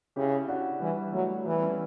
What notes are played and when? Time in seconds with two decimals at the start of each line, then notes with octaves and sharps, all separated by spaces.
0.16 C#3 E4 G4
0.48 D4 F#4
0.81 E3 G3
1.13 F#3 A3
1.45 E3 G3 B3
1.62 C#4 E4